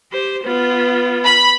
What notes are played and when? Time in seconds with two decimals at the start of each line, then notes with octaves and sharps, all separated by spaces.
0.12 G4 C5
0.43 B3 F4
1.24 B5